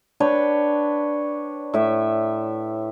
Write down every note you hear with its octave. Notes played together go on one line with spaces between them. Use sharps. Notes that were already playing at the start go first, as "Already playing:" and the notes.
D4 B4 C#5 G5
A2 E5